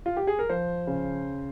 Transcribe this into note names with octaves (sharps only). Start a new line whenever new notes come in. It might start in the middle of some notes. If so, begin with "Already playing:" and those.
F4
G4
G#4
A#4
F3 C5
C#3